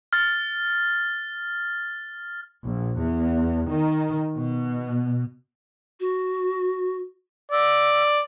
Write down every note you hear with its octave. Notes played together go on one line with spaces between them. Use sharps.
F6 A6
A#1
E2
D#3
B2
F#4
D5 E6